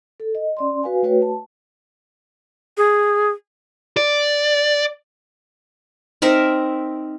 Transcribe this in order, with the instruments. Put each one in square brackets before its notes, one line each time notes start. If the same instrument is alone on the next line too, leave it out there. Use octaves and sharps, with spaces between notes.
[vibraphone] A4
D#5
C#4 D5 C6
F#4 B4 F5 G#5
A3 F#4 B4 C#5 G5
A5
[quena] G#4
[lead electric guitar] D5
[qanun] C4 D#4 A#4 E5